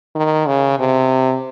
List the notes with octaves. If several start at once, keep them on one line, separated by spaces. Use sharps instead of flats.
D#3
C#3
C3